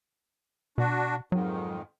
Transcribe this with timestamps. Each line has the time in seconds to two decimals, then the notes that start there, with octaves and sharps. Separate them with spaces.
0.78 B2 D4 F#4
1.32 F2 G#2 D#3 F#3